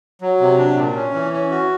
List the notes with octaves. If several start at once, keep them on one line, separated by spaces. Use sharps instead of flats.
F#3
C3
D4
A#2
C#4
E3
C#4
F#4